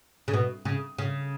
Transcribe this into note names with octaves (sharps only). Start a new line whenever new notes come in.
C#3
B2
C#3
C#3